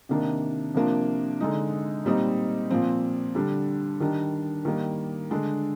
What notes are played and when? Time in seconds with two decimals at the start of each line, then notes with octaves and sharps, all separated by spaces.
0.09 C3 D#3 A#3 D4
0.75 C3 F3 A#3 D4
1.40 D3 G#3 D#4
2.05 A#2 G3 C4 D#4
2.70 A#2 F3 C4
3.35 D3 G3 D4
4.00 D#3 G3 D4
4.65 D#3 G3 A#3
5.31 D3 G#3 D4